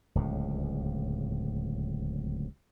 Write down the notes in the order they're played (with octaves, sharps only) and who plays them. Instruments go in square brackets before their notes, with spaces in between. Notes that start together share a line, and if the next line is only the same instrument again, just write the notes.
[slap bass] D1 C#2 A2